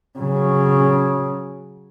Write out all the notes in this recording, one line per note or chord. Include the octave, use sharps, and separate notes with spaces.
C#3 F#3